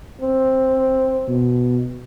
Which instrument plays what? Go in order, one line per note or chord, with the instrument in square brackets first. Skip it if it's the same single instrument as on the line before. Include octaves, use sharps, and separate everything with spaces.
[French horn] C4
[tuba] B2